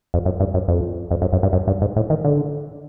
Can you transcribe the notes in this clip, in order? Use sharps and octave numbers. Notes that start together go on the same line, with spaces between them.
F2
F#2
G2
F#2
F2
F2
F#2
F#2
G2
F#2
G2
G#2
A2
D#3
D3